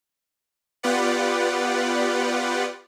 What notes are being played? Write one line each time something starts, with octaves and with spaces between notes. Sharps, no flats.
B3 F4 G4 B4 D5 F#5